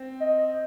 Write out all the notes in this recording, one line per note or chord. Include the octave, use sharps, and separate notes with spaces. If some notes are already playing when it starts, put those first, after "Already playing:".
Already playing: C4
D#5